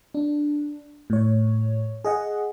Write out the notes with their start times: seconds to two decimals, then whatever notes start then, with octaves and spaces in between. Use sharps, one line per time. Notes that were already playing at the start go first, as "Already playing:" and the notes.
0.14 D4
1.10 A2 C#5
2.05 G#4 D#5 F#5